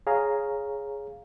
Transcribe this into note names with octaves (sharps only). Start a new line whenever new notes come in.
G#4 C#5 F5 A#5